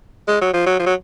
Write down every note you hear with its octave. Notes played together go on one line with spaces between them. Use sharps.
G#3
F#3
F3
F#3
F3
F#3